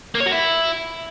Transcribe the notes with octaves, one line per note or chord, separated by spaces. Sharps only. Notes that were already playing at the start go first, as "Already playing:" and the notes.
A#3
C#5
F#4
E4